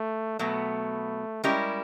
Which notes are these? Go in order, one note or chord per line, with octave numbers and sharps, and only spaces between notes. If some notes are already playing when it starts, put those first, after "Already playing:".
Already playing: A3
B2 F#3 A3 B3
G3 G#3 C#4 E4 G4 A#4